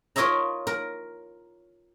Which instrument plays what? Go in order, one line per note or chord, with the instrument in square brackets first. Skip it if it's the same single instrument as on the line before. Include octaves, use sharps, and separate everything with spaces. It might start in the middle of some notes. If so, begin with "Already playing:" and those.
[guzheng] F4 A#4 C#5 D#5 E5 A#5
A#4